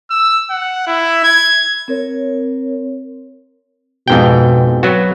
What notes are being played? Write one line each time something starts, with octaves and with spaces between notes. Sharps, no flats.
E6
F#5
E4
G#6
C4 A#4 C#5
F2 G#2 B2 G5
F#3 B3 F#4